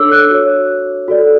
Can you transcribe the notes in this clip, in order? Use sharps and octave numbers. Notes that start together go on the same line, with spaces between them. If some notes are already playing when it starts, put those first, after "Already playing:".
Already playing: D4 A4 C#5 D6 E6
F#6
F#4 C#5
F#4 A4 D5